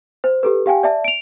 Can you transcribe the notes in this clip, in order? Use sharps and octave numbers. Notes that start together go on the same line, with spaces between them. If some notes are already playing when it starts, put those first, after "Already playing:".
C5
G4 A4 B4
G4 F5 G5 G#5
D5 E5 A5
D7 F7